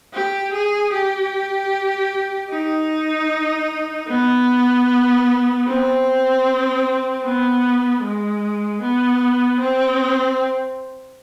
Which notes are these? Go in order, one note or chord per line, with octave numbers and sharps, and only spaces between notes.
G4
G#4
G4
D#4
B3
C4
B3
G#3
B3
C4